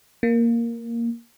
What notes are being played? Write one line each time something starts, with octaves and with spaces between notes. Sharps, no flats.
A#3